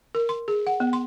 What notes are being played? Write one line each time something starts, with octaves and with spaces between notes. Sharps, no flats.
A#4
C6
G#4
F#5
B3
C6